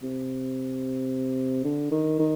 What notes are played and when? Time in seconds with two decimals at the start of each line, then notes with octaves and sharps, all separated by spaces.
0.02 C3
1.64 D3
1.91 D#3
2.19 D#3